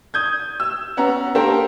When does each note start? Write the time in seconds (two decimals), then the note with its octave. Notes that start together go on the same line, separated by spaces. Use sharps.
0.14 D#6 G6 G#6
0.60 E6
0.97 B3 C#4 F#5 A#5
1.35 A#3 D4 G4 A4 A#4 C5